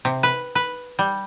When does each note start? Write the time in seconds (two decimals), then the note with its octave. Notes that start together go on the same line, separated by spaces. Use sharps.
0.05 C3
0.23 B4
0.55 B4
0.99 G3